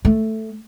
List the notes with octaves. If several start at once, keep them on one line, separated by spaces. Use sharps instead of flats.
A3